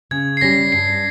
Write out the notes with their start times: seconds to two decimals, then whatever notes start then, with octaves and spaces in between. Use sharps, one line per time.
0.11 C#3 G#6
0.37 C7
0.41 G3 C#4 A#6
0.72 G2 C7